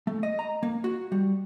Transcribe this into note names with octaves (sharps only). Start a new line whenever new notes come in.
A3
D#5
A#5
A#3
F#4
G3